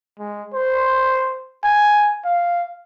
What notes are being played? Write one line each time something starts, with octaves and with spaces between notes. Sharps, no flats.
G#3
C5
G#5
F5